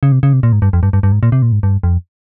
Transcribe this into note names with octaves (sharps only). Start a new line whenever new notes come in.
C#3
C3
C#3
C3
A#2
G#2
G2
F2
G2
G2
G2
G#2
A#2
C3
A#2
G#2
G2
F2